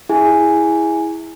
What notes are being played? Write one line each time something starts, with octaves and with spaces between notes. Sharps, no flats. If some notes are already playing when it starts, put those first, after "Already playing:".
E4 G#4 G#5